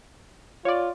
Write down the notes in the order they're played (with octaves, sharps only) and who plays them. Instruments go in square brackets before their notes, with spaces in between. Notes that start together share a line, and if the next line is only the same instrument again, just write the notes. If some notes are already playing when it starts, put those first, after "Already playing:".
[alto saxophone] F4 [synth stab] C#5 D5